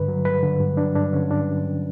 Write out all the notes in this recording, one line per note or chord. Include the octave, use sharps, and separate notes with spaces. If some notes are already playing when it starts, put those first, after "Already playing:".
Already playing: G2 D3 B4
F#3
G2 B4
D3
G2
F#3 D4
G2 D4
D3 C#4
G2 D4
F#3
G2